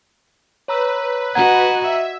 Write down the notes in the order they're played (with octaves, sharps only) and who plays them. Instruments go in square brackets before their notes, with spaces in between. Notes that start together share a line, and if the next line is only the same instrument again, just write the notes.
[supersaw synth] B4 [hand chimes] C#5 A#5 E6
[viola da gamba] F#4 D#5 [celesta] F#5 A#5 [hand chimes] G#6
[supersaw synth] E5